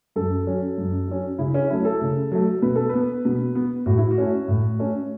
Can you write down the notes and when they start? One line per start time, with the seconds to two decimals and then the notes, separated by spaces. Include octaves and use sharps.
0.16 F#2 A4
0.47 F#3 C#4
0.78 F#2
1.08 F#3 C#4
1.39 C#3 E4
1.54 C#4
1.70 F#3 A3 E4
1.85 A4
2.01 C#3
2.32 F#3 A3
2.62 B2 B4
2.76 A4
2.89 B3 B4
3.25 B2
3.55 B3
3.86 A2 F#4
3.98 E4
4.11 F#4
4.18 A3 C#4
4.48 A2
4.79 A3 C#4